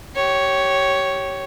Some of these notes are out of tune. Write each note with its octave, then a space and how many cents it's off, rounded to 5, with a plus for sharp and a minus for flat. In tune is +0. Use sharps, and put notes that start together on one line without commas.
G4 -20 C#5 +0